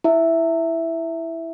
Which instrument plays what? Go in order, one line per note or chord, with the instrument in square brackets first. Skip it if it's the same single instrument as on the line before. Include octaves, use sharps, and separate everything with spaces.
[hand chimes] E4 E5